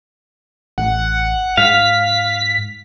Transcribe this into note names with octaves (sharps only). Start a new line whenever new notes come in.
A1 F#5
G#2 F5 B6